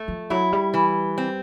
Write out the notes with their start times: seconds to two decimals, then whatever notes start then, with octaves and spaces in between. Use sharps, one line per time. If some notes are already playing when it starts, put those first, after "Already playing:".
Already playing: A3
0.08 F3
0.30 F#3 E4
0.53 G3
0.74 E3
1.18 C4